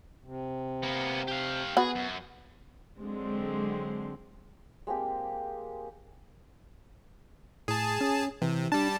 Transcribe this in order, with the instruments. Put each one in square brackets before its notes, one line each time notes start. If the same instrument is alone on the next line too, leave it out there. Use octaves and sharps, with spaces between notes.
[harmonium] C3
[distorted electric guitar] A#3 B3
G4 F5
[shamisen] B3 F#4 [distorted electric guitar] G#4
[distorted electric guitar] F#2
[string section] D3 F#3 G#3 C4
[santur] G#3 A#3 C4 G4
[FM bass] A2 [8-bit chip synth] G#4 A5
[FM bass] C#4
[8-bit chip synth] C3 [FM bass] E3
[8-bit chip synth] G3 A5 [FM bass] D4